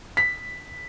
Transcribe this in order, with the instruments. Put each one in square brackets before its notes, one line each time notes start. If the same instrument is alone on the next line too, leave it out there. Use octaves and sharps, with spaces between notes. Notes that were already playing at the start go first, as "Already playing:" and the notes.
[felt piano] B6